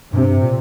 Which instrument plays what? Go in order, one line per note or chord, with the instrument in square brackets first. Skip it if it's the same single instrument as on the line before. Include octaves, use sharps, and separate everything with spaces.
[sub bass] G2 [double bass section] C3
[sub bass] A#2